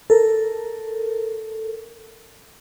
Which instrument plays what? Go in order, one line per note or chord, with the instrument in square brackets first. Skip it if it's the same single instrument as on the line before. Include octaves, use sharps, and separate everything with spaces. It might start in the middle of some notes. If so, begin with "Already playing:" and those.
[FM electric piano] A4 A#4